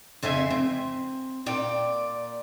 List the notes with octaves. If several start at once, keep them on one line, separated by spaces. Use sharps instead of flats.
F2 C#3 G#4 E5 G#5
C4
A#2 D5 G5